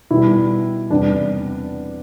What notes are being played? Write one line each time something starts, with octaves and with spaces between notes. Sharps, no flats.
B2 G3 E4
E2 C3 G3 D4